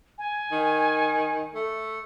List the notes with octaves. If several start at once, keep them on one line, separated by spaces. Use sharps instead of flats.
G#5
D#3
A3